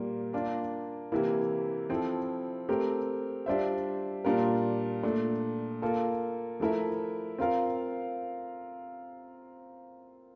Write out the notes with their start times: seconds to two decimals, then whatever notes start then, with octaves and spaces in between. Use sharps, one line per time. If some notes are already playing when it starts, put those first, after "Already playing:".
Already playing: A#2 G3 A#3
0.33 A#3 D4 F4
1.12 C3 E3 A#3 E4
1.89 F3 C4 E4 A4
2.69 A3 C4 G4 A#4
3.46 G3 D4 F4 C5 E5
4.25 A#2 G3 D4 F4 A#4
5.03 A#2 A3 D4
5.82 A#3 F4 A4
6.60 F3 A3 E4 A#4 E5
7.38 C4 F4 A#4 F5